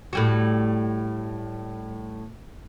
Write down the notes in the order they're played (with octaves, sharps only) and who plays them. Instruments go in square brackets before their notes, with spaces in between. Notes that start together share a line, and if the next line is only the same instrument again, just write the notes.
[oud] A2 G3 F#4